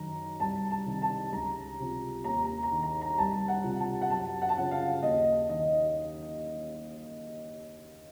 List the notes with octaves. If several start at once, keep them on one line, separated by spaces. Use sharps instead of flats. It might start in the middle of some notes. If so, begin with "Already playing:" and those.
Already playing: F#2 D#3 A#5
C2 A5
A5
C3 D#3
A5
C#2 A#5
C3 F3
D#2 A#5
A#5
A#5
D#3
A#5
A#5
C2 A5
F#5
C3 F3
A5
F#5
F#2 A5
F#5
A5
C#3 F3 F#5
F5
D#2 D#5
D#3 D#5